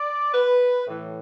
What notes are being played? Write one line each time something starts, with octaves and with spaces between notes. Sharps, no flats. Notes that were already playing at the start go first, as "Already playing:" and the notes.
Already playing: D5
B4
A2 E3